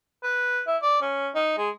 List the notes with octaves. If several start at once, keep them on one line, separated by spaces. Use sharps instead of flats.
B4
E4
D5
C#4
D#4
G#3